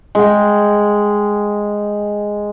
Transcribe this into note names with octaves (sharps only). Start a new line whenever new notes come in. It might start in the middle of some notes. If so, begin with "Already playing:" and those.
G#3 G5